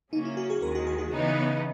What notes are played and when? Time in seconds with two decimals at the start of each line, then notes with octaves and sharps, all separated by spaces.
0.13 C#3 F#3 A#3 C#4 D#4
0.25 E4
0.37 F#4
0.50 G#4
0.62 D#2 D#3 G#3 A#4
0.75 F#4
0.87 G#4
0.98 F#4
1.12 C#3 E3 B3 D#4